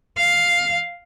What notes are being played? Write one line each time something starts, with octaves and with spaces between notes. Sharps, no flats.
F5